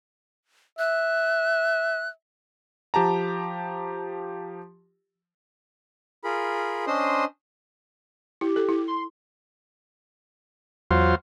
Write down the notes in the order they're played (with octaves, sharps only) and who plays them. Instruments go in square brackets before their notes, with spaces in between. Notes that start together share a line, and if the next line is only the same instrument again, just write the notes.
[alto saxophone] E5 [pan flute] F#6
[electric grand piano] F3 G4 A5 A#5
[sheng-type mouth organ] F4 G#4 A#4 B5
C#4 D4 C5 D#5 C6 D#6
[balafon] E4 [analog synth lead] G4
[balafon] A4
E4
[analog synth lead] C6
[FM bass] E2 [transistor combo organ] F#3 F4 C5